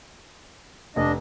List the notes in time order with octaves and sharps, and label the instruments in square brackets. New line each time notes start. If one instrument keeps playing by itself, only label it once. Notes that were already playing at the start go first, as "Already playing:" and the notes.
[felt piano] F1 [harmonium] D4 D#5